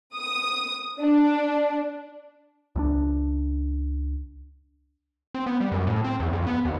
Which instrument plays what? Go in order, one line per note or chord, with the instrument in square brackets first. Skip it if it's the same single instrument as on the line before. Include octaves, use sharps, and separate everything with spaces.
[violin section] D#6
D4
[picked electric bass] C#2 G3 D4
[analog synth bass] C4
B3
G3
F#2
A2
C4
E2
F2
B3
D#2